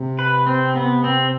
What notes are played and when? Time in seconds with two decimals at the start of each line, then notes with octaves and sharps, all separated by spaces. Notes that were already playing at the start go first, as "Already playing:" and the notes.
Already playing: C3
0.19 B4
0.47 C4
0.76 B3
1.04 C4